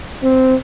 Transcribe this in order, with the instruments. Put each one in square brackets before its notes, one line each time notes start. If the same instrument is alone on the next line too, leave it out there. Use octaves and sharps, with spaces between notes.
[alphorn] C4